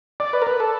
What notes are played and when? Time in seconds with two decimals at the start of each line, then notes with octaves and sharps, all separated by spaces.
0.20 D5
0.33 B4
0.42 A#4
0.47 B4
0.60 A4